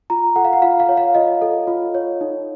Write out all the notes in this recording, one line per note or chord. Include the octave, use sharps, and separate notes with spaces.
F4 A#5
A4 F#5
F5
F#5
F4 F5
F5
C#5
F5
F4 D#5
A4
F4
C#5
D#4